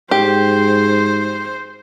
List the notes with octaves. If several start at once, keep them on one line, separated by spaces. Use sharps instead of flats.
G#2 G4 C5